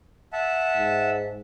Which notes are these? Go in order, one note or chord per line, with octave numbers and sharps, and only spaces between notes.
E5 F#5 A5
G#2